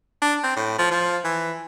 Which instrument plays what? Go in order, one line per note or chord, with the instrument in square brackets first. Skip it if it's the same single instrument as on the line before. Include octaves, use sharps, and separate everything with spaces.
[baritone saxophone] D4
C4
A2
F3
F3
E3